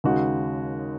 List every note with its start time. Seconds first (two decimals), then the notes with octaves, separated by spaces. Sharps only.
0.04 D#2 C#3 G#3 D#4 F#4